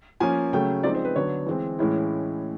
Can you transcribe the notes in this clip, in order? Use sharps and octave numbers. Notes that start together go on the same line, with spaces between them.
F3 A#3 C#4 G#5
C#3 F#3 A3 C#4 G5
F3 G#3 C4 D#4 D5
C5
B4
D3 F#3 B3 C#5
E3 G#3 C4
A2 E3 G#3 C#4 E4